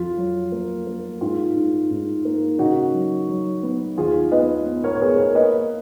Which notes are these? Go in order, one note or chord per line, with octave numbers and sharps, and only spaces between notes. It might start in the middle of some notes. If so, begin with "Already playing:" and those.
Already playing: F2 F4
F#3
A#3
A#3
G#2 F4
G#2
G#2
A#3
C#3 D#4 F#4
F#3
F#3
B3
D#2 F4 G#4
B3 B4 D#5
B3
A#4 C#5
C#5
B3 G#4 B4
A#4 C#5
A#3 B4 D#5